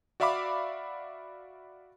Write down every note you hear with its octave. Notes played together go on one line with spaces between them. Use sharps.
F#4 D5 E5 F5 B5 D6